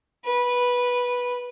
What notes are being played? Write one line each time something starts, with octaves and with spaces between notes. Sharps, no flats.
B4